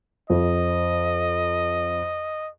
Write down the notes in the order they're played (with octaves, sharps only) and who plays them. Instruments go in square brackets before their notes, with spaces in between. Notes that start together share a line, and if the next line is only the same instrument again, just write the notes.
[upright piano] F2 [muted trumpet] D#5